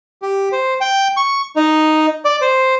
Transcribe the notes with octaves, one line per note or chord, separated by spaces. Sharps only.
G4
C5
G5
C#6
D#4
D5
C5